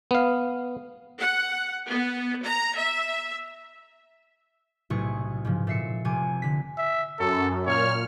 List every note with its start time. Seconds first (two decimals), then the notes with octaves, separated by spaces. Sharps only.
0.11 B3 F5
1.19 F#5
1.89 B3
2.45 A#5
2.76 E5
4.90 B1 A2 C3 A3 G#4 C#6
5.45 G#2 C#3 F3
5.67 A#2 A4 E5 C7 C#7
6.05 F1 C3 G#5 D6
6.42 D3 B6
6.78 E5
7.19 F#2 A4
7.66 A#2 C#5 F6